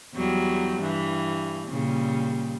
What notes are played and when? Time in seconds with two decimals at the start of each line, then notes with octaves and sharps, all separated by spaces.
0.14 E2 F#3 G3
0.80 G2 E3
1.67 A#2 C#3 G3